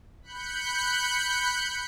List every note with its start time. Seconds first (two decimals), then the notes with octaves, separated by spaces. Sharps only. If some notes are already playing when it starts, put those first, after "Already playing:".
0.22 B5 F#6 G6 C#7